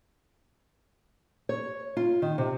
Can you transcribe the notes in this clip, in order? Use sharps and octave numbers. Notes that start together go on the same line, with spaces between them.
C#5
F4
D#3
C3